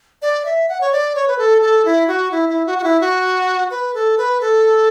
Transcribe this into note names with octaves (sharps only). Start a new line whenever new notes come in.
D5
E5
F#5
C#5
D5
C#5
B4
A4
A4
E4
F#4
E4
E4
F#4
F#4
E4
F#4
B4
A4
B4
A4